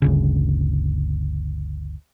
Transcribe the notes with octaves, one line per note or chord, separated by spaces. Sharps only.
G1 D2 C#3